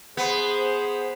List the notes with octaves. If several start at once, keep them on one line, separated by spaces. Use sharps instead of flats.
B3 G#4 C5